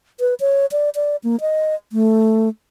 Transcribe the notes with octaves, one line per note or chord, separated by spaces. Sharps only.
B4
C#5
D5
D5
A#3
D#5
A3